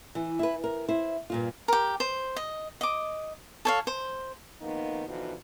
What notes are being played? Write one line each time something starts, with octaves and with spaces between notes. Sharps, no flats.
E3
E4 B4
A#4
E4 C5
G2 A#2 F4
G4 A#4
C5
D#5
D#5 D6
A4 C#5 F5
C5
F2 D#3 A#3 B3 D#4
B2 D3 E3 F3 D#4 F#4